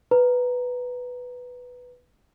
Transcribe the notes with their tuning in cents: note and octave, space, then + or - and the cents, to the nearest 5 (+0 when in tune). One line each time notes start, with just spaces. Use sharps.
B4 +0 A#5 +0